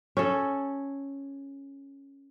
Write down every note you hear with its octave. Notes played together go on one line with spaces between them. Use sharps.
C#4 A4